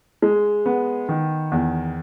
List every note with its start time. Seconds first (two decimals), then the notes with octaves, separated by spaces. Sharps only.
0.22 G#3
0.66 B3
1.09 D#3
1.52 E2